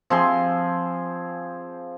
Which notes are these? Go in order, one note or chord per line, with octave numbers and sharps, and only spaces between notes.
F3 C4 G#4 C6